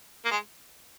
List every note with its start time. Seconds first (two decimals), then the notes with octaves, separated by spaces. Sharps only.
0.25 A#3
0.31 G#3